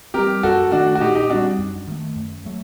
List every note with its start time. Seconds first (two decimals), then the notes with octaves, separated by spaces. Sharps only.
0.14 G3 C4 G4 A#4
0.43 F#2 F#4 A4
0.72 D#3 A3 D4 F#4
0.95 F#4
1.00 A#2 D#4 G4
1.15 D#4 G4
1.30 G3 C4 D4 F#4
1.59 F#2
1.88 D#3 A3
2.16 F#2
2.45 F#3 A3